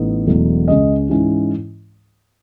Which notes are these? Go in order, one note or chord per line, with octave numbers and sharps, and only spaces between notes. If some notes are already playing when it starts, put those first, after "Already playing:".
Already playing: A1 A2 B3 D#4
E1 E2 B2 F#3 A3
C#2 C#3 G#3 C#4 D#5
G#2 E3 G#3 C#4 E4